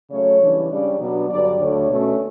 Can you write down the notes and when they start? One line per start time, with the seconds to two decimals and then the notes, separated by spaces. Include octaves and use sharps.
0.10 C#3 F#3 A3 C#5
0.40 C#3 E3 G3 D4
0.70 C#3 G3 D4 D5
1.00 B2 F#3 B3 D4 D5
1.30 G2 D3 F#3 D5
1.59 D2 D3 A3 D4 C#5
1.88 B2 A3 C#4